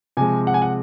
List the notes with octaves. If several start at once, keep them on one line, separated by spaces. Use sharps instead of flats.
C3 F3 G#3 G#5
F#5
G#5
F#5